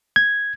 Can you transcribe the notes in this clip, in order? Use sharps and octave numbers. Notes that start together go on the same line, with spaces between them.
G#6